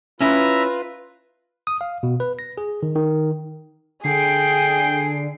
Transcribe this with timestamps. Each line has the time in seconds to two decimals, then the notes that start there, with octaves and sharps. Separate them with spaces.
0.21 C#4 E4 F4 B4 E5 A#5
1.67 D#6
1.81 F5
2.03 B2
2.20 B4
2.39 A#6
2.58 G#4
2.83 D#3
2.95 D#3
4.04 D3 G#4 G5 C7 D7